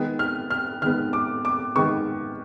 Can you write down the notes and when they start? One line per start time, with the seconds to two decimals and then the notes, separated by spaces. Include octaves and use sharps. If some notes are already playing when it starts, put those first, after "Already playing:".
Already playing: D#3 G#3 B3
0.19 F6
0.50 F6
0.82 D#3 G#3 B3 F6
1.13 D6
1.45 D6
1.76 D#3 G#3 B3 C#6